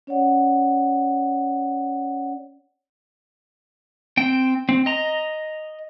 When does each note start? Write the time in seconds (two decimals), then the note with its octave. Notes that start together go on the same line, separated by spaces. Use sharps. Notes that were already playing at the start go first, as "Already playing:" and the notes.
0.07 C#4 C#5 D5 F#5
4.17 C4 G5
4.69 C4
4.86 D#5 A#5